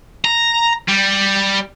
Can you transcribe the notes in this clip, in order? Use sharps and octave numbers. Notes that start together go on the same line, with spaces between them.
A#5
G3